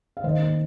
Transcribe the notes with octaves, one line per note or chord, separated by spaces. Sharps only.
F5
D#3 C5 D#5
A#3